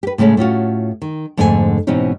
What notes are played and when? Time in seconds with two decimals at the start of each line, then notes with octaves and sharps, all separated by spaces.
0.03 G4 B4
0.18 A2 C#3 G#3 A3 C#4
0.37 A2 C#4 F4 F#4
1.02 D#3
1.37 F2 G#2 D3 A3 F4 G#5
1.87 G#2 B2 E3 C4 C#4 D#4